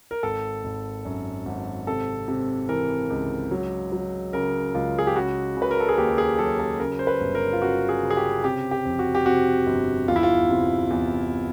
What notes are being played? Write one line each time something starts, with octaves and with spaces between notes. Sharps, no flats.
A#4
G#1 A4
G#1
F#2
G#1
C3 A4
C3
E3 A#4
C#2
F#3
F#3
C#3 A#4
C#2 F4
G#4
G4
C#3 F#4
C#3
B4
A#4
A4
G#4
D#2 G4
G#4
F#3 A4
A4
C#3 A#4
C5
B4
G1
A#4
F4
C#3 F#4
G#4
C#3
G#4
G4
C3 G4
G4
F2
F#4
G4
C3 F#4
G1
E2 F4
E4
F4
C3
E2